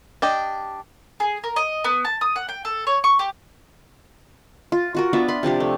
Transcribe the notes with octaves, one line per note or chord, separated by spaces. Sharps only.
D4 G4 D#5
G#4
A#4
D#5
B3
A5
D#6
F#5
G5
A4
C#5
C#6
G4
F4
F4 F#4 A#4
B3 D4 F4 E5
B5 C6
C3 F3 D4 G4
A3